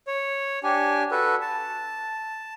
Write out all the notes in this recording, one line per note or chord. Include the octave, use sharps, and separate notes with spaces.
C#5
D4 G4 G#5
F#4 A4 B4
A5